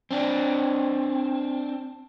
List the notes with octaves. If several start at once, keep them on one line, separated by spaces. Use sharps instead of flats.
C4 D4